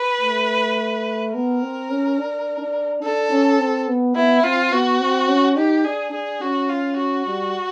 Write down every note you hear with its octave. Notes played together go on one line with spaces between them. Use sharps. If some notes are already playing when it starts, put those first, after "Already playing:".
Already playing: B4
A3
B3 A#4
C4
C#4
D4
D4
D4 A4
C#4
C4
B3
B3 E4
C4 F4
B3 F#4
C4
C#4
D#4 G4
D4 G#4
D4 G#4
C#4 F#4
F4
F#4
G3